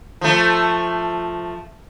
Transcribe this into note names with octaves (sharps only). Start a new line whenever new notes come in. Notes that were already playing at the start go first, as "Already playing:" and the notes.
F3 A3